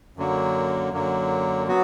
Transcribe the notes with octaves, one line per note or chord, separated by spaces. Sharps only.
F#2 D3 F#3 A#3
F#2 D3 F#3 A#3
F#3 B3 F#4